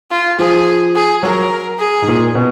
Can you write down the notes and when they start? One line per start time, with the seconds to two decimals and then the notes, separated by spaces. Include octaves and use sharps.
0.11 F4
0.39 F3 G#4
0.95 G#4
1.23 F#3 A#4
1.79 G#4
2.02 G#2
2.08 A#2
2.35 B2